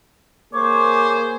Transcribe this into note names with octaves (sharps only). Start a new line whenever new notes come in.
A#3 G#4 C5 C#5 D6